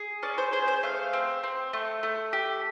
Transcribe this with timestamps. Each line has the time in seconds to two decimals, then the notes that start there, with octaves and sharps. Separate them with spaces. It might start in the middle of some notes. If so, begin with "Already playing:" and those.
Already playing: G#4
0.23 C#4 D5
0.38 C5
0.53 G#4 C5
0.68 C5
0.83 A3 F5
1.13 C4
1.44 C4
1.73 A3
2.03 A3
2.33 G4